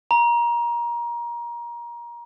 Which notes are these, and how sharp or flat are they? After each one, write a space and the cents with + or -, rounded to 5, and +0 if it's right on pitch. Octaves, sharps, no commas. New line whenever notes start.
A#5 +25